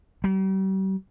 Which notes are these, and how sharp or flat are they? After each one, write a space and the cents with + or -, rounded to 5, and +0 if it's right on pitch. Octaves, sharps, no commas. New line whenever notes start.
G3 -40